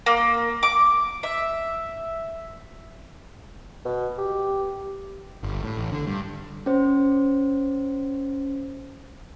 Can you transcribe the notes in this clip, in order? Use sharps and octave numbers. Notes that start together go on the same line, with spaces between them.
A#3
D6
E5
B2
G4
G1
A2
A1
D3
G2
C#4 C5